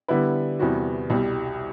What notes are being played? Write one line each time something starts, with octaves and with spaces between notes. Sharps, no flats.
D3 G3 B3 E4 B4
E2 C3 G3 B3 F#4
C2 B2 G3